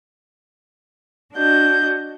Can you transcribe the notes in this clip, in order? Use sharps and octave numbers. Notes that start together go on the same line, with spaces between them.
D4 F#4 D#5 G6